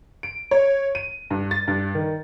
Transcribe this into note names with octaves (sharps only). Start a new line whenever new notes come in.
D7
C#5
D#7
G2
A6
G2
D#3